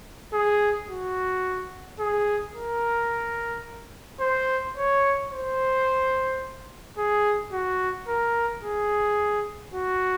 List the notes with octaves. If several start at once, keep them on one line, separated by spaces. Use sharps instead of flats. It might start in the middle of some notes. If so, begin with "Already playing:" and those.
G#4
F#4
G#4
A#4
C5
C#5
C5
G#4
F#4
A#4
G#4
F#4